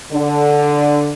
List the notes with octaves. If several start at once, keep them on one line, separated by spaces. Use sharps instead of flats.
D3